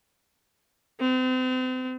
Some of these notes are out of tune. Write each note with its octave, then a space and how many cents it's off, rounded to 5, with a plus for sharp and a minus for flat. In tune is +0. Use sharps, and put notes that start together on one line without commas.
C4 -35